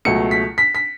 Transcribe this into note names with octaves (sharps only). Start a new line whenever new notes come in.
C#2 B2 F#3 A3 C#7
B6
B6
B6